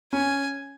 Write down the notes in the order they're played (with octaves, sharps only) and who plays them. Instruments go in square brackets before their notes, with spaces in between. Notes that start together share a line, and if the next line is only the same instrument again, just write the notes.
[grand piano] C#4 [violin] G#5